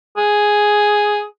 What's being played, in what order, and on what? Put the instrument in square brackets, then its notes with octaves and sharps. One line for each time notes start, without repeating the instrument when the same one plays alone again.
[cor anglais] G#4